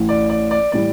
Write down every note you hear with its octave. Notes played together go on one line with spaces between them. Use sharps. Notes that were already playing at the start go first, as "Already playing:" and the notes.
Already playing: A1 A2 E3
D5
D5
D5
A2 E3 G3 D5